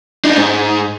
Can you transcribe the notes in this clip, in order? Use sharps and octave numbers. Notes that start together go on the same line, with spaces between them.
D4 D#4
G#2